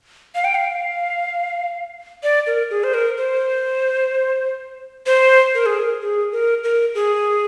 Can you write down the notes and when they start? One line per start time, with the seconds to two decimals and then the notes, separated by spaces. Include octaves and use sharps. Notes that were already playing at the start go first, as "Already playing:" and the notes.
0.35 F5
0.44 G5
0.55 F5
2.23 D5
2.47 A#4
2.70 G#4
2.84 C5
2.94 A#4
3.18 C5
5.06 C5
5.54 A#4
5.66 G#4
5.79 A#4
6.02 G#4
6.32 A#4
6.64 A#4
6.95 G#4